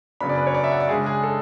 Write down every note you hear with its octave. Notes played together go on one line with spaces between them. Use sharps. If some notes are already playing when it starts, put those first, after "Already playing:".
F#2 C#3 F#3 B3 D4 B5
D5
B4
C#5
D5
E5
F#5
D5
C#3 G#3 D4 G#4
G#4
A4